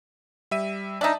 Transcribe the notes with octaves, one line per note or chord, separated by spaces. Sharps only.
G3 E5 D#7
D4 D#4 D5 E5 A5